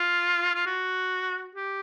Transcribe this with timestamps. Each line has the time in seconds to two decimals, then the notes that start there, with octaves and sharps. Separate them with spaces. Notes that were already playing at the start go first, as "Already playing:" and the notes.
Already playing: F4
0.54 F4
0.66 F#4
1.55 G4